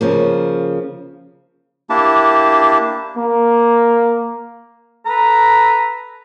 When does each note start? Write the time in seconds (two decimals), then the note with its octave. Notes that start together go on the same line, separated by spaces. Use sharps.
0.01 C#3 F3 A#3
1.90 A#3 D4 E4 G4 A5
3.18 A#3
5.06 A4 B4 A#5